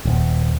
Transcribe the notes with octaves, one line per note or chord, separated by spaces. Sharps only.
D#1